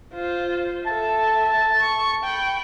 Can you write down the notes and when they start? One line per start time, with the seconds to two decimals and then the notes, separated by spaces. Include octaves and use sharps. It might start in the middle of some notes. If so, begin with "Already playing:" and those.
0.13 F4 C5
0.86 A4 E5 A5
1.77 C#6
2.24 G5 B5